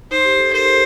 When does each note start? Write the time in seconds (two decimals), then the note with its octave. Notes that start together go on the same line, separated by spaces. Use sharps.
0.11 D#4 C5
0.25 G4
0.39 A4
0.52 A#4 C5